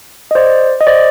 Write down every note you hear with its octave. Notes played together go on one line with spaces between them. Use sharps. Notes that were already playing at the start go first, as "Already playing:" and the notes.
D#5
C5 D5
D#5
C5 D5